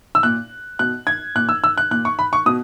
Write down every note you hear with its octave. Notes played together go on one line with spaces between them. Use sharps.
E6
A#2 F#6
B2 F#6
G#6
A#2 F#6
E6
E6
F#6
A#2 F#6
C#6
B5
C#6
B2 D#6